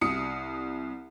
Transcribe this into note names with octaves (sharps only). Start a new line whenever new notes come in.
C2 D#6 C#7